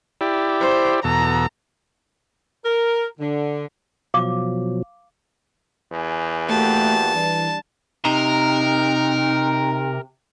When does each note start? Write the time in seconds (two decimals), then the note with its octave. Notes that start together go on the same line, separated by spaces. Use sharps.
0.21 E4 G4 D5
0.61 C5
1.04 E2 B2 A4 A#5
2.64 A#4
3.19 D3
4.14 B2 F3 F#3 F5 D6
5.92 E2 G#5
6.49 A3 A#3 F#4 G4 A5
7.12 E3 G3 D4
8.05 C3 D#4 A#4